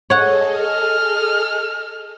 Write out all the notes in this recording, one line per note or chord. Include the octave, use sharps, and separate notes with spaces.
G#4 A4 C#5 D#5 F#5
F6